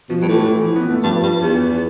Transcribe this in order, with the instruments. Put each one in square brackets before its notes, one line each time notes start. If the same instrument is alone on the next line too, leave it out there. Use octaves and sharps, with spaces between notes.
[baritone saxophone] B2 [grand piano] F3
[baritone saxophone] G2
[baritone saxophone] A2 [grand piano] E3
[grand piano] E3
F3
B3
A3
[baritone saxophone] G2 [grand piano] F3
[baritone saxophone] G2
E2